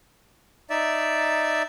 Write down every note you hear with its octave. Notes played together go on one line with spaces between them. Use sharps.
D#4 D5 E5